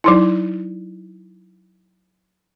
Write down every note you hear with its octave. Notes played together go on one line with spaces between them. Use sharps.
F#3 D#4 E4